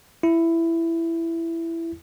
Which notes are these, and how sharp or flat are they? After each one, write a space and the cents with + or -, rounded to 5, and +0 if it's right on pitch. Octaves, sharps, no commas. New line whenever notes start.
E4 +10